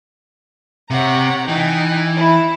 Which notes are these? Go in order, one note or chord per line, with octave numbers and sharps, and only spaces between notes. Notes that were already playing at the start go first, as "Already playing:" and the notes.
C3 C#5 F#5 A#5
E3 D#4 G5 G#5
E4